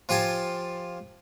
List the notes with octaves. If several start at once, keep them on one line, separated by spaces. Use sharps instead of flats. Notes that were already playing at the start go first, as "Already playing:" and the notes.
F3 F4 G4 G#5 A5